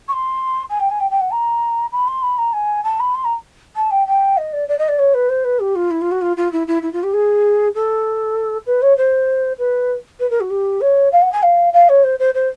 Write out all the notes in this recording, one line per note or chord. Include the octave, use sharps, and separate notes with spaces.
C#6
C6
G#5
G5
G#5
G5
G5
F#5
A#5
B5
C6
B5
A#5
G#5
A5
B5
C6
A#5
A5
G5
G5
D#5
D5
D5
D#5
D5
C#5
B4
C5
B4
G4
F4
E4
F4
F#4
F4
F4
E4
E4
E4
F4
G4
G#4
A4
B4
C#5
C5
B4
B4
A#4
F#4
G4
C#5
F5
F#5
G#5
F5
F5
C#5
C5
C5
C5